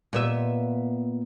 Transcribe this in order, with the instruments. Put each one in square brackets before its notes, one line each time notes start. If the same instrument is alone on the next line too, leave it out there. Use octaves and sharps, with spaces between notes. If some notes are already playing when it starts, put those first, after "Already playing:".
[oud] A#2 B3 E5